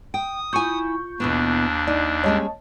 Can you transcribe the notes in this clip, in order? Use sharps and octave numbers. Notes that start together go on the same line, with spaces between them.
G5 D#6
E4 F4 G#5 C#6 G6
D#2 B2 E3 B3 D4
D#4 D5
G3 G#3 C#4 C#5 D#5 A5